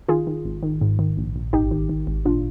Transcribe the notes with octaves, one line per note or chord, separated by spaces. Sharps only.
D#3 F4 G#4
D#3
G#1
D#3
G#2
D#3
A#1
A#1
G#1 D#4 G4
D#3
D#3
G#1
A#2 D4 F4